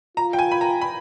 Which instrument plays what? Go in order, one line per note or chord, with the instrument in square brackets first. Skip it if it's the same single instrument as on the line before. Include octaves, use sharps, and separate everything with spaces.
[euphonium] F4 [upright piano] A#5
[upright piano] G5
G#5
B5
A#5
B5